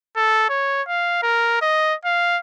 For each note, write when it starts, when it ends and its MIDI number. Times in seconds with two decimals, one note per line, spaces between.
0.17 0.47 69
0.49 0.82 73
0.88 1.18 77
1.23 1.59 70
1.62 1.95 75
2.05 2.39 77